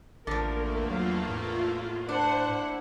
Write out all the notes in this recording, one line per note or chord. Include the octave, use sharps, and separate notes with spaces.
A1 E2 D3 F3 A3 A#3 A#4
F#3 F4 F5
A2 F4
D4 E4 C5 F#5